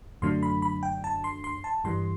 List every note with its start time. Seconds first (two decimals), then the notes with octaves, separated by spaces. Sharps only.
0.22 F#2 D3 F#3 A3 D4 C6
0.43 B5
0.62 B5
0.83 G5
1.04 A5
1.24 C6
1.44 C6
1.64 A5
1.84 G2 E3 G3 C6